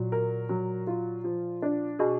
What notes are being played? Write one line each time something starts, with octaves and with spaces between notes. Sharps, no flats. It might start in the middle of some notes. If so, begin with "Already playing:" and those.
Already playing: A#2 F#3
A#4
F#3
F4
F3
D4
B2 G#4